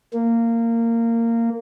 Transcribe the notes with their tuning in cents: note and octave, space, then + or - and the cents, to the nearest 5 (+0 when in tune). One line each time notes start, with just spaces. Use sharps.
A#3 -15